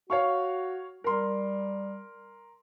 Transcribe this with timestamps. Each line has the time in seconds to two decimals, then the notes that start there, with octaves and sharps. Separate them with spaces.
0.10 F#4 C#5 F5 C#6
1.04 G3 A#4 C6